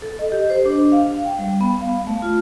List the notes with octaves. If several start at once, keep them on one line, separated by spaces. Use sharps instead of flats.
A4
D#5
G4
C5
D4
F5
G5
G3
B3
F5
A3
F4